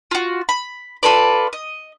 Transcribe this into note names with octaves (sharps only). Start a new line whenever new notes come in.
F4 F#4
B5
F4 A4 B4 D5
D#5